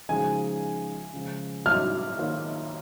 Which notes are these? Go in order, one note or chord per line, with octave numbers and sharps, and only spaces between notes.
C#3 F3 G#3 D#4 G#4 G#5
C#3 F3 G#3
F6
D#3 A#3 F4 C#5